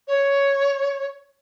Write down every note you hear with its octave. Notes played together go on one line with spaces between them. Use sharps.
C#5